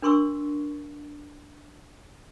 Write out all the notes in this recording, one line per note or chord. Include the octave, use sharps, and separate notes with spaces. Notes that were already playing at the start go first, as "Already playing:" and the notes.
D4 A#4 C6 C#6 E6